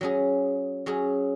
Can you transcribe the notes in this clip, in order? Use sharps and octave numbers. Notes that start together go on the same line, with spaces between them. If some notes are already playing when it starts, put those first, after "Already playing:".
F#3 C#4 G#4
F#3 C#4 G#4